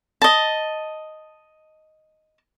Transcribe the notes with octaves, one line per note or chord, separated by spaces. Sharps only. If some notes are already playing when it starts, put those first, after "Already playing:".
D#5 A5